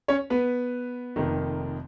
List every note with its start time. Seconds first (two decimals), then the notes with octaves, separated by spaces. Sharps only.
0.08 C#4 C#5
0.30 B3 B4
1.16 F1 F2 D#3 A#3